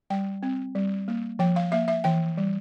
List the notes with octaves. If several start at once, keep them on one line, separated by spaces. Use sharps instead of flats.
G3 G5
C4
G3
A#3
F3 G5
F5
A#3 E5
E5
E3 G5
G3